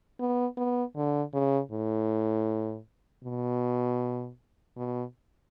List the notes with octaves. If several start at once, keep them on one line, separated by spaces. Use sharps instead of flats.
B3
B3
D3
C#3
A2
B2
B2